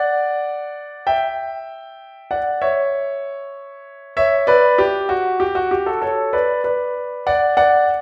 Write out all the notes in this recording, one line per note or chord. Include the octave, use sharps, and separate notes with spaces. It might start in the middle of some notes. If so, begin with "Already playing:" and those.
Already playing: D5 F#5
E5 G5
D5 F#5
C#5 E5
C#5 E5
B4 D5
G4
F#4
G4
F#4
G4
F#4 A4
A4 C#5
B4 D5
B4 D5
D5 F#5
D5 F#5